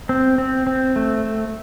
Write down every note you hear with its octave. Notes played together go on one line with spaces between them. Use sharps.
C4
C4
C4
A3